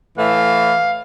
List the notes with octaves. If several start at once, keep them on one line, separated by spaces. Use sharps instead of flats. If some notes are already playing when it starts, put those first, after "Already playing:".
A2 E3 A3 F5